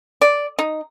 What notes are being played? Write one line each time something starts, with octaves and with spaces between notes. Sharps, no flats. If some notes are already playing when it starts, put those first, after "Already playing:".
D5
D#4